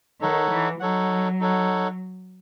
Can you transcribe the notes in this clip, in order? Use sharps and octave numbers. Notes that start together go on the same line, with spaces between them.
D#3 D#4 A4 C#5 F#5
E3
F#3 D#4 A4 C#5 F#5
D#4 A4 C#5 F#5